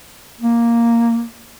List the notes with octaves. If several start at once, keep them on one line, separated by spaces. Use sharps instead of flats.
A#3